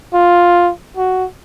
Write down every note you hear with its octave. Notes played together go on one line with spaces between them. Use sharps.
F4
F#4